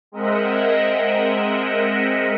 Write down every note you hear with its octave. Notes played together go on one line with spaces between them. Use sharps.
G#3 C4 A#4 D#5 E5 F#5